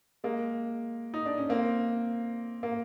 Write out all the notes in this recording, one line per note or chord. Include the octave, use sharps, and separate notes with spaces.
G#3 A#3
D#4
D4
C#4
A#3 C4
A#3